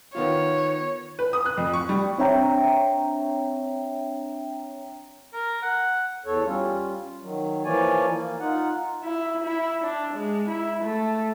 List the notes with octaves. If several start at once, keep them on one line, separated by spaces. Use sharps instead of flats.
D#3 B3 F4 C#5
B4
D#6
F#6
F2
C#6
G3
C4 D4 C#5 E5 G5 A#5
A#4
F#5
E2 A4 C#5
G3 C#4 F4
D#3 F#3
E3 F3 A#3 C#5 D5 G#5
A#3
D#4 F4 F#5
E4
E4
D4
G#3
E4
A3